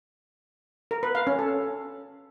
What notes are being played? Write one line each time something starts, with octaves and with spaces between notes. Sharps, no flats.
A#4
B4
F5
C#4
A4